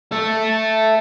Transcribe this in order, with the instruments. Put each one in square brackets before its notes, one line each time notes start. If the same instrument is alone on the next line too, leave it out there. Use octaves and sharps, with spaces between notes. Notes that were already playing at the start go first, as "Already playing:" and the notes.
[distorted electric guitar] A4 E5